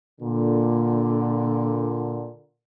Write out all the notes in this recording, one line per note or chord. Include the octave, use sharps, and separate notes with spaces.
A#2 D3